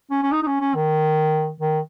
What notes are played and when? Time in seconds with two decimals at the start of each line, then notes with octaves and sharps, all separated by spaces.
0.11 C#4
0.23 C#4
0.32 D#4
0.43 D#4
0.47 C#4
0.61 C#4
0.75 D#3
1.61 D#3